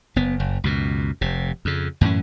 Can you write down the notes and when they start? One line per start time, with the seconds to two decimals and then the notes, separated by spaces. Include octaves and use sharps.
0.16 F#1 B3
0.40 F#1
0.64 C#2 F#2 B2
1.21 F1 C3
1.65 F2 C#3
2.01 F#2 A2 E3 C#4